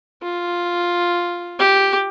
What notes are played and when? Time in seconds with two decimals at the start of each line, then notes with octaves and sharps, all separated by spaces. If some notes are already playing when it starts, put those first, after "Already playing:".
0.23 F4
1.59 G4